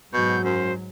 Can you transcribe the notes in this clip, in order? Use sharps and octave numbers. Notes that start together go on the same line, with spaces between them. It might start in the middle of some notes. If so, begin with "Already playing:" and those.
G#2 B2 F#3 F#4 G6
F#2 C5